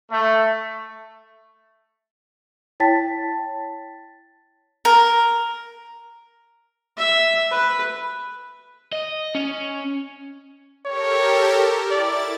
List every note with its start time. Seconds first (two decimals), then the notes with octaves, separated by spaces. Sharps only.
0.11 A3
2.80 E4 C#5 G5 A5 A6 B6
4.85 A#4
6.98 E5
7.51 B4
8.93 D#5
9.35 C#4
10.86 G4 A4 A#4 C#5
11.90 E4 D5 A6